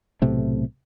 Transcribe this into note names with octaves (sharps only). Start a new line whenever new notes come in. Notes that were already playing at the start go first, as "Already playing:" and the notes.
B1 A2 C3 A3